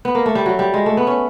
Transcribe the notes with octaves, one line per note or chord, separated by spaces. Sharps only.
B3
A#3
A3
G3
F#3
G3
G#3
A3
B3
C#4